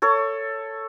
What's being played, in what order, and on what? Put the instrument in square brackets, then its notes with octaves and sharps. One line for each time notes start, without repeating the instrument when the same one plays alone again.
[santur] A4 C#5